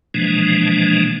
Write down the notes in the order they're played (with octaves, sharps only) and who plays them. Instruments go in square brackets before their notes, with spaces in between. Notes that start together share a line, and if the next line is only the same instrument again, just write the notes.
[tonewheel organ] B2 E3 F3 G#3 A#3 D4